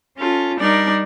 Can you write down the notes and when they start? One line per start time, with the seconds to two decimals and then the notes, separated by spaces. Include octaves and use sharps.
0.17 C#4 F4 A4
0.58 G3 D4 D#4 A#4 D5